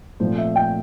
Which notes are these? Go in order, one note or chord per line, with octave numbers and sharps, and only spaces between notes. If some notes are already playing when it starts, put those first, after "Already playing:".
A#2 F3 A3 C4 C5
E5
G5